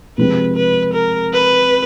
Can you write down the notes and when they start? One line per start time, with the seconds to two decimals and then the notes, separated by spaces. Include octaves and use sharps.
0.18 C3 F3 G#3 C4 B4
0.56 B4
0.94 A#4
1.33 B4